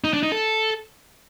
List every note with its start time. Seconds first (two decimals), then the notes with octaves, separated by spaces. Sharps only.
0.04 D#4
0.13 D4
0.23 D#4
0.32 A4